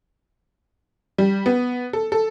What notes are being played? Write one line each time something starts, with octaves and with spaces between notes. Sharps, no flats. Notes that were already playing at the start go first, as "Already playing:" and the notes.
G3
B3
A4
A4